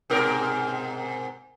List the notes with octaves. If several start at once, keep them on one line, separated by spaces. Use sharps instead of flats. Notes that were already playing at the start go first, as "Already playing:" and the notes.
G#2 B2 A#4